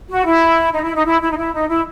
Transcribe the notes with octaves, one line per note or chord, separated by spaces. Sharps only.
F#4
E4
D#4
E4
D#4
E4
E4
D#4
E4
D#4
E4